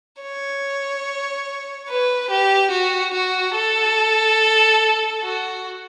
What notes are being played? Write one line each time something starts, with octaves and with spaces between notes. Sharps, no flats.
C#5
B4
G4
F#4
F#4
A4
F#4